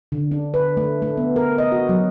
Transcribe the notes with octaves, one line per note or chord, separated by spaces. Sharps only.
D3
D4
B4
A3
A3
B3
A#4
D#5
F#4
F#3